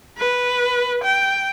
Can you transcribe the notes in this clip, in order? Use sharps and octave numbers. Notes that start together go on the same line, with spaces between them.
B4
G5